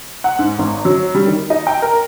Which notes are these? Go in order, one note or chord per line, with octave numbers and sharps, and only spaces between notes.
F#5
G#2
G#1
F#3
G3
D#3
D#4
G5
A#4